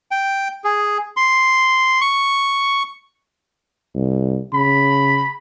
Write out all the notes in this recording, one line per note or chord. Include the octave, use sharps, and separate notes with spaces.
G5
G#4
C6
C#6
C2
C#3 B5